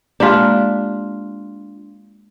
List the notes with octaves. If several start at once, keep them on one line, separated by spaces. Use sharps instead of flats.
G#3 A#3 D4 F4 G4